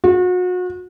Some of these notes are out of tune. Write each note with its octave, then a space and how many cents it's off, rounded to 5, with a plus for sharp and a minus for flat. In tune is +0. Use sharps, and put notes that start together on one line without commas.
F#4 -35